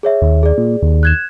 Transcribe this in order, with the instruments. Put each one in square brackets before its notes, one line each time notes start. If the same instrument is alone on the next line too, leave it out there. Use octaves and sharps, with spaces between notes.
[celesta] G#4 C#5 E5
[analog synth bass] D#2
[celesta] G#4 D5
[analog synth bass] A#2
D#2
[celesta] F#6 G#6 E7